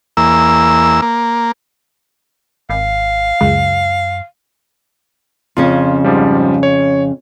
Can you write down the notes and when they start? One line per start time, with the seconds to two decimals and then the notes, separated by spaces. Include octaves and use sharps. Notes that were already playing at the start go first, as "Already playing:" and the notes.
0.17 E2 A#3 E6
1.02 A#3
2.70 G#1 F5
3.41 C#2 F#2
5.57 F2 C#3 C#4 F4
6.04 G#2 F3 G3
6.63 C#5